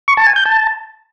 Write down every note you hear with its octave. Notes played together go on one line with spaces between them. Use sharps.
C#6
A5
G#5
G6
A5